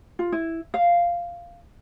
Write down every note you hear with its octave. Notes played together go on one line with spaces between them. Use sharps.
F4
E4
F5